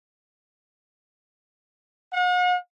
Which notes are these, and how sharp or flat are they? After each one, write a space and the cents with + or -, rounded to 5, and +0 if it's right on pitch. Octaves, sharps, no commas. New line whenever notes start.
F#5 -45